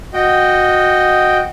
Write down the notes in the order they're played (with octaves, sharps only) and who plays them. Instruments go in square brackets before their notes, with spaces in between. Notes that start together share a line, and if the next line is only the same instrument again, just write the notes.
[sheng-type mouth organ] F#4 D#5 G5